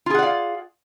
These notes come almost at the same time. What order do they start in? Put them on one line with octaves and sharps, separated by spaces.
F4 G#4 F#5 D5 F5